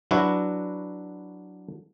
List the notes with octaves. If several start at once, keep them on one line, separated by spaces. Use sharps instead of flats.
F#3 D4 E4 F#4 B4